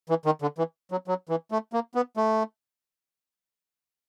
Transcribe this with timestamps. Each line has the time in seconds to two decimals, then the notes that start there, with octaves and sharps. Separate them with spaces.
0.09 E3
0.26 D#3
0.42 D3
0.58 E3
0.91 F#3
1.08 F#3
1.29 E3
1.51 A3
1.73 A#3
1.95 B3
2.17 A3